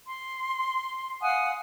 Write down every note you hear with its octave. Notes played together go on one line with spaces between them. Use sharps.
C6
F5 F#5 G#5 D#6